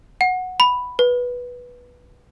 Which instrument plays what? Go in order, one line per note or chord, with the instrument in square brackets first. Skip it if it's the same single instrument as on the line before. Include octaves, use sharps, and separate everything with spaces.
[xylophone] F#5
B5
B4